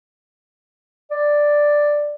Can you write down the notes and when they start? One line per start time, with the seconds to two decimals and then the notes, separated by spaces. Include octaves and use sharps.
1.11 D5